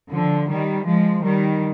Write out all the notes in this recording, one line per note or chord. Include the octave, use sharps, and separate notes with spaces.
D3 F3
D#3 G3
F3 G#3
D#3 G3